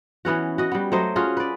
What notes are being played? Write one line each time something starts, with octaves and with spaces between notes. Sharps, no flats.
E3 B3 C#4 F#4
F#4 D#5
G3 B3
F#3 A3 C5 D#5
C#4 F4 F#4 G#4
B4 D5